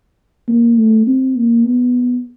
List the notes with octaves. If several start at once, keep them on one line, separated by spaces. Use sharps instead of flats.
A#3
A3
C4
A#3
B3